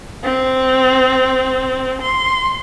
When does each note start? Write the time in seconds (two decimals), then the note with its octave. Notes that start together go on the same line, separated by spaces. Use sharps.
0.23 C4
2.01 C6